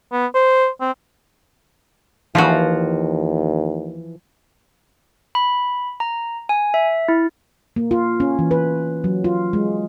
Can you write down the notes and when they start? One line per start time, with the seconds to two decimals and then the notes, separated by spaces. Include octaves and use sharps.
0.12 B3
0.35 C5
0.81 C4
2.35 D#2 E3 F3 F4 F#4
5.35 B5
6.00 A#5
6.49 G#5
6.74 E5
7.08 E4
7.76 A#3
7.91 F4
8.20 C#4
8.39 E3
8.51 B4
9.04 F#3
9.24 F4
9.53 G#3